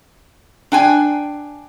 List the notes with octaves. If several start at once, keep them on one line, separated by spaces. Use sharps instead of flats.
D4 G5 G#5